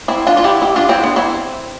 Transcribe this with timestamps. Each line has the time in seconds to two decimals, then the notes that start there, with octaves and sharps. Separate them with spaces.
0.08 C4 E4
0.27 D4 F4
0.37 F4
0.44 E4 G4
0.62 E4 G4
0.76 D4 F4
0.89 C4 E4
1.03 B3 D4
1.16 C4 E4